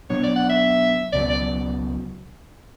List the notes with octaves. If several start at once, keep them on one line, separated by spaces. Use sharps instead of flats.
B2 F#3 B3 D4 C#5
D5
F#5
E5
C#2 B2 F#3 D5
D5